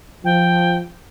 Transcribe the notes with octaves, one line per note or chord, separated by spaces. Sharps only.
F3 G5